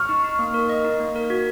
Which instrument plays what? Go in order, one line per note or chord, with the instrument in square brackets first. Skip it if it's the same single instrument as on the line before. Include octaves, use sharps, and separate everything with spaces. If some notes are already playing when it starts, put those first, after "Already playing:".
Already playing: [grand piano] C#6 F6
[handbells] D#4
D#4
A#3
A#4
D#5
D#4
A#3
A#4
F#4